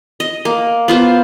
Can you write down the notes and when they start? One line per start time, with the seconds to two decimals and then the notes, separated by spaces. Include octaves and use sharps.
0.20 D#5
0.45 A#3
0.88 B3 F4 C5